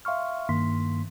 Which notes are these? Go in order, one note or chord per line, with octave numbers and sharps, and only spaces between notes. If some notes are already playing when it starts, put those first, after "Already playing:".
E5 F5 C6 C#6 F6
G2 D#3 A#3 C6 B6